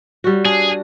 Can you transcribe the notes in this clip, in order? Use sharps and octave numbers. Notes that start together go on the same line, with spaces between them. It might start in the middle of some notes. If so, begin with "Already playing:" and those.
G3 F#4
D4 G#4